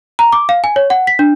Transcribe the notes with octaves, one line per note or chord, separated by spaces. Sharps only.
A#5
D6
F5
G#5
C#5
F#5
B6
D4